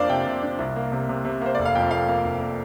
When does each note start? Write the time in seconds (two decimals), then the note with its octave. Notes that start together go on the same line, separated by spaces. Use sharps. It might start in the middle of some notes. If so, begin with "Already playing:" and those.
Already playing: F2 A#3 D4 C5 D5 F5
0.09 C3 G5
0.26 C3
0.42 D4
0.59 C2
0.76 A#3
0.92 C3
1.09 C3
1.25 C3
1.42 A#3 C5
1.55 F1 D5
1.65 F5
1.75 F2 G5
1.91 A#3 F5
2.09 A#3
2.25 F1
2.42 A#3